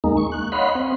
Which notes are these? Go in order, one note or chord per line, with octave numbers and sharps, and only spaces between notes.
D#2 G#3 A#3 D#4
C#6
F#6
C#5 D#5 F5 F#5 B5 C6
C4